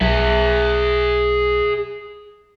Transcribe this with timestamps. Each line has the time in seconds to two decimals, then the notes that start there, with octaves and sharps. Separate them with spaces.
0.01 B1 G#4 E5